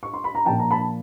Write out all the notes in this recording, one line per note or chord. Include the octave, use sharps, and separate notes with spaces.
C#6
C6
B5
A#5
A#2 F3 G5 A5
A#5
A5 B5